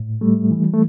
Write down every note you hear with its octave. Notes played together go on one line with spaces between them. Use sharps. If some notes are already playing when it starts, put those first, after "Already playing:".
Already playing: A2
G3 A3
E3
A3